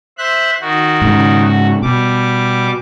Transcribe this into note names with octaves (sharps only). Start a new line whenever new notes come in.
C5 E5 F#6
D#3 F#4
G#2 C#3
F#4
B2 G3 D6